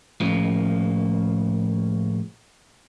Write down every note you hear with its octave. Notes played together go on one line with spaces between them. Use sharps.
A2 C#3 F3 A#3